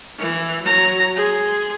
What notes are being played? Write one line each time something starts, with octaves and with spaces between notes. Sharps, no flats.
E3
F#3 A#5
G#4 C6